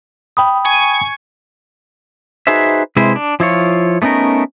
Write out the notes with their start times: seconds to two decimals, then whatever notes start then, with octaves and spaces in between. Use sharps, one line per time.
0.37 G5 B5 D#6
0.65 G#5 C#6 G#6
2.47 D#4 F#4 G#4 B4 C5 E5
2.96 C3 G#3 E4 B4 C5
3.16 D4
3.40 F3 E4 F4 C#5
4.02 A3 B3 C#4 D#4 A#4